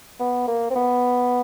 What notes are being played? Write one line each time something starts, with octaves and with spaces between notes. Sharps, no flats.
B3
A#3
C4
B3